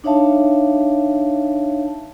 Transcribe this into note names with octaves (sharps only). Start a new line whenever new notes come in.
D4 D#4 C#5 E5 F5 A5